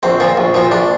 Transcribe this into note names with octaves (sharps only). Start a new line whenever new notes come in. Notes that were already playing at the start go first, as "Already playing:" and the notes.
A#1 C4
A#2 F3
A#1
A#2 F3
A#1 D4